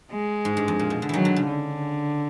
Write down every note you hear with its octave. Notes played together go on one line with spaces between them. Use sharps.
G#3
G#2
G2
F2
A#2
B2
D3
D#3 E3 F#3
D3
C#3
D3